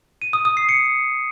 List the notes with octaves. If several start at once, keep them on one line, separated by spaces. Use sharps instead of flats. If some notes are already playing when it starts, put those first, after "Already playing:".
D#7
D#6
D#6
C7
C#7